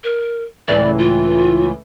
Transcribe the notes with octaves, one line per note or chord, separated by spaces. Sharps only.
A#4
C#2 A2 E3 D5
F4